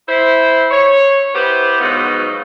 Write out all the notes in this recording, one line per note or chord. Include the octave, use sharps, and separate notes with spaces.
E4 C5
C#5
B3 E4 G4 B4 C5
G#2 B2 F3 F#3 B3 D#4